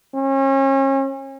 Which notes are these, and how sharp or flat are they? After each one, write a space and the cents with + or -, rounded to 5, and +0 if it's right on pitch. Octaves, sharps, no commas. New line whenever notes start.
C#4 -35